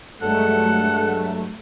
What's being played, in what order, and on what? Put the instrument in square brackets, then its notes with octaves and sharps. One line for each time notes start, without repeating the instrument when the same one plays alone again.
[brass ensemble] G2 G#3 [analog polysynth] F#3 A3 [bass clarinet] A4 [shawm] F#5